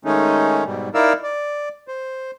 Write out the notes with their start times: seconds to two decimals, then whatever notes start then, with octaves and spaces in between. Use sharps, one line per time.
0.05 D#3 G#3 A3 C#4 D#4
0.65 G#2 B2 G3
0.94 D#4 E4 A#4 D5 F5 E6
1.23 D5
1.88 C5